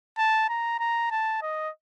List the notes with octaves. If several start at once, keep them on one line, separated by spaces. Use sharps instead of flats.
A5
A#5
A#5
A5
D#5